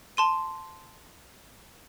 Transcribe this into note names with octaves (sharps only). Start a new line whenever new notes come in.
A5 C6 D#7